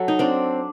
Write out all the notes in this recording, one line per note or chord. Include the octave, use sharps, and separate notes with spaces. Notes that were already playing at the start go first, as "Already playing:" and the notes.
Already playing: F#3 A4
D#4
C4 D4